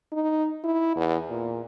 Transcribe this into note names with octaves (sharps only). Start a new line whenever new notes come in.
D#4
E4
E2
A#2